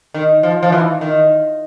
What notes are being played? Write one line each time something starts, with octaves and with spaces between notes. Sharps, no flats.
D#3
F3
F3
E3
D#3